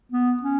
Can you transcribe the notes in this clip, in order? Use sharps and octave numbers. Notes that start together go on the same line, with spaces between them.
B3
C#4